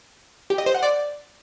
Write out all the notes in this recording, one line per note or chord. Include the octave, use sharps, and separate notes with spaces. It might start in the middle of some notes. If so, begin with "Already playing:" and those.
G4
D#5
C5
F#5
D5